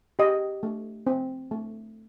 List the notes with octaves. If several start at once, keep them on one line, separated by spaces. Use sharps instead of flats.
G4 D#5
A3
C4
A3